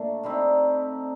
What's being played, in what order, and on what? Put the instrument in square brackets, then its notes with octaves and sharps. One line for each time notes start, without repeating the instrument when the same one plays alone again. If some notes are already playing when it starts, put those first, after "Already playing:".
Already playing: [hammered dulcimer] A#2 A3 D4
C3 G3 C4 D#4